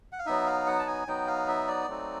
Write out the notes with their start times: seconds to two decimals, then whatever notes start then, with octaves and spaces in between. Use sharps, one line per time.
0.12 F#5
0.19 F5
0.26 F#3 B3 D#4 E5
0.47 F5
0.67 F#5
0.79 A5
0.87 G#5
1.07 F#3 B3 D#4 G5
1.27 F5
1.48 E5
1.68 D5
1.88 F#3 A3 C4 D#4